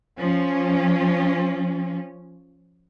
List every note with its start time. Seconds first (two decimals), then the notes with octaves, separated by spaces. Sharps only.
0.17 F3 C#4